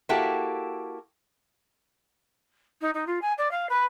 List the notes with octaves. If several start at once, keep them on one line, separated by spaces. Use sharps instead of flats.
A#3 E4 F#4 G4 A4
D#4
D#4
F4
G#5
D5
F5
B4